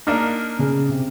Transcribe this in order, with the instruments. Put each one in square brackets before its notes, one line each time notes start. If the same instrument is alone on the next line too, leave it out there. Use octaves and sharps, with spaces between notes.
[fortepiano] A#3 D4 D#4 [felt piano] F6
[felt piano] C#3 G#4
C3